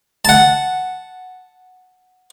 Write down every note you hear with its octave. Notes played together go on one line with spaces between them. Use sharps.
F#5 A5